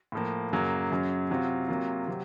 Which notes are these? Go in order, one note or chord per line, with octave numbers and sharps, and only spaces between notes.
A2 F3 A#3
F#2 C#3 F#3 A#3
F#2 C#3 F#3
C3 F#3 C4 F4
C3 F#3 A#3 F4
C3 F#3 C4